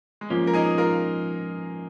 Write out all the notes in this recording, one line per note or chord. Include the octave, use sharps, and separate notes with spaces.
G#3
G#2 F3 A#3 C#4
A#4
D#4 G#4
F4 A#4